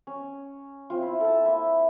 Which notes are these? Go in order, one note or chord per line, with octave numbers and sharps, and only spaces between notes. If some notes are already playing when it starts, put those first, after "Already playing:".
C#4
C4 F4
E4
A4 A5
A#3 E4